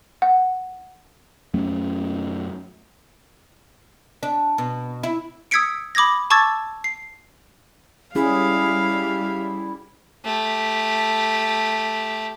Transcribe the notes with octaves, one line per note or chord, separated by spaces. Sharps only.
F#5
F#2 F#3 A3 C#4
D4
B2
E4
D#6 E6 G#6 B6 C#7 D7
B5 D6 D#6 G#6 A#6
A5 C#6 D6 E6 G#6 A6
C7
G3 C#4 E4 G#4 F5
A3 G4